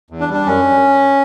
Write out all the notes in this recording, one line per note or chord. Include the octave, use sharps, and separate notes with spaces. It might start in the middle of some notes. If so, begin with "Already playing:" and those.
E2
D4
G3
D4
F#2 C#4